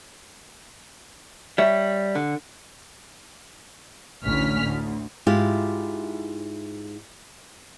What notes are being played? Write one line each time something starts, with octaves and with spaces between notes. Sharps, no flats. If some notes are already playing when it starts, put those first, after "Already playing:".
G3 C#5 E5
D3
A1 D2 C#4 F6 B6
D2
G#2 E4 F4 G4